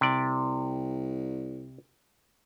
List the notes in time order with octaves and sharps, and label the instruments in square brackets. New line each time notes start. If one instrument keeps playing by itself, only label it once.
[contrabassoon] C2 [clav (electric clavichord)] C3 D5